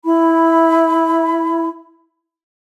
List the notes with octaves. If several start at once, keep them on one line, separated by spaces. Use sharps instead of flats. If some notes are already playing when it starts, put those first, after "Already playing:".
E4 B5